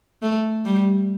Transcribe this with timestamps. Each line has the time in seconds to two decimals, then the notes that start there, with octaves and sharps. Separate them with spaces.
0.23 A3
0.65 G3